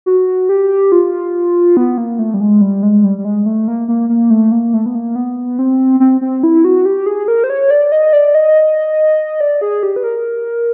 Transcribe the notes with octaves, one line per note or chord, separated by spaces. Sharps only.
F#4
G4
F4
B3
A#3
A3
G3
G#3
G3
G#3
G3
G3
G#3
A3
A#3
A#3
A#3
A3
A#3
A3
B3
A#3
B3
C4
C4
C4
E4
F#4
G4
G#4
A#4
C5
C#5
D5
D#5
D5
D#5
D5
G#4
G4
B4
A#4